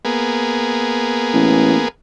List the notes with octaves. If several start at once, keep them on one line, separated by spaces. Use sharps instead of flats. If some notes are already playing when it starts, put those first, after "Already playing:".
A#3 B3 G#4
A1